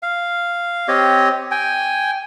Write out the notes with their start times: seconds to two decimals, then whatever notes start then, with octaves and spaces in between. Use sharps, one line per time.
0.03 F5
0.88 C4 G4 C#5 D#5
1.51 G5 G#5